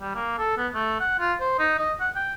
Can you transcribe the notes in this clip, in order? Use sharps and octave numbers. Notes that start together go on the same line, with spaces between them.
G3
A#3
A4
B3
A3
F#5
F4
C5
D#4
D#5
F#5
G5